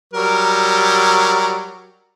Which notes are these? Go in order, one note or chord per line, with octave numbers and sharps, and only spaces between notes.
F#3 G3 A#4